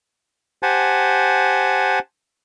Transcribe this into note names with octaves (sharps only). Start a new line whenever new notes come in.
G4 C5 F#5 G#5 A5